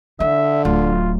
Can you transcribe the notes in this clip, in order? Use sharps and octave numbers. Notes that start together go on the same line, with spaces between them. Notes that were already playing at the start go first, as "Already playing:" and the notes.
D3 E4 E5
D1 F4